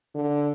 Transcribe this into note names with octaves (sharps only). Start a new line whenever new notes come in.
D3